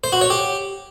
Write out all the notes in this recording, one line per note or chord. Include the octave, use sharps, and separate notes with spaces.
C5
F#4
C#5
G4